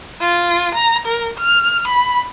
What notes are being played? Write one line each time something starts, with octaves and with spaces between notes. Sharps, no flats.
F4
A#5
A#4
F6
B5